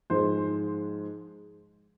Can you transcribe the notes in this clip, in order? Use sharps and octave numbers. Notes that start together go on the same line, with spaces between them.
G#2 F3 G#3 C5